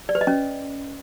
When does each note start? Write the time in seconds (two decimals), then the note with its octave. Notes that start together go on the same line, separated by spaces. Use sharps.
0.09 D5
0.15 B4
0.21 D#5
0.27 C#4